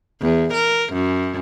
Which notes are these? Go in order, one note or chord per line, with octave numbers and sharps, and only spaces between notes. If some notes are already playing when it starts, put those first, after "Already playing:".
E2
A#4
F#2